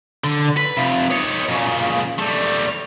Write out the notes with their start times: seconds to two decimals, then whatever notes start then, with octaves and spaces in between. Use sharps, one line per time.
0.24 D3
0.57 B4
0.77 C3 F3
1.11 D#4 C#5
1.50 A#2 C#3
2.18 G3 A3